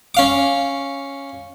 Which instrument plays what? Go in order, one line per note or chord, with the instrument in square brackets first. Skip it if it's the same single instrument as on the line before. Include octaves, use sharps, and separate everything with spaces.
[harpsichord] C#4 F5 D6